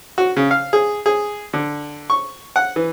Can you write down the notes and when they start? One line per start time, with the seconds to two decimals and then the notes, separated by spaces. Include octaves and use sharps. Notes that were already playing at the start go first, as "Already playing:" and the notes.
0.18 F#4
0.37 C#3
0.51 F5
0.73 G#4
1.06 G#4
1.53 D3
2.10 C#6
2.56 F#5
2.76 E3